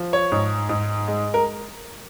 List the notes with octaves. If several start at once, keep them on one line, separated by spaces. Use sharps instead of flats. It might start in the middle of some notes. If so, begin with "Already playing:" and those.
Already playing: F3
C#5
G#2
G#2
G#3
A#4